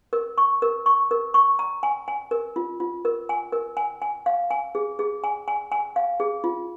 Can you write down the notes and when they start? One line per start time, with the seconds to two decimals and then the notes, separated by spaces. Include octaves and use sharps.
0.13 A#4
0.38 C#6
0.62 A#4
0.86 C#6
1.11 A#4
1.34 C#6
1.59 A#5
1.83 G#5
2.08 G#5
2.31 A#4
2.56 F4
2.80 F4
3.05 A#4
3.29 G#5
3.52 A#4
3.77 G#5
4.02 G#5
4.26 F5
4.51 G#5
4.75 G#4
4.99 G#4
5.24 G#5
5.48 G#5
5.72 G#5
5.96 F5
6.20 G#4
6.44 F4